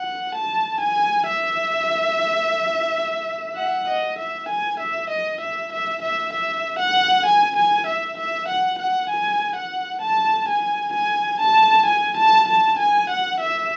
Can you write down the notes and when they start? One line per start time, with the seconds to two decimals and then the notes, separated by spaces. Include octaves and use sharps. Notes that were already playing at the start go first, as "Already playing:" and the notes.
Already playing: F#5
0.35 A5
0.80 G#5
1.26 E5
3.56 F#5
3.88 D#5
4.18 E5
4.48 G#5
4.79 E5
5.10 D#5
5.40 E5
5.72 E5
6.02 E5
6.33 E5
6.79 F#5
7.25 G#5
7.56 G#5
7.87 E5
8.17 E5
8.48 F#5
8.79 F#5
9.09 G#5
9.56 F#5
10.01 A5
10.48 G#5
10.93 G#5
11.40 A5
11.86 G#5
12.17 A5
12.48 A5
12.78 G#5
13.09 F#5
13.40 E5